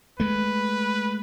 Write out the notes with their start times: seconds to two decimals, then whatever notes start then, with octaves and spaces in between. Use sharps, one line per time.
0.20 G#3 A3 B4